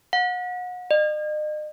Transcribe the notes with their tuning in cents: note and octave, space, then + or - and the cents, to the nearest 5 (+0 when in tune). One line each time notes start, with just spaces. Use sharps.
F#5 -35
D#5 -40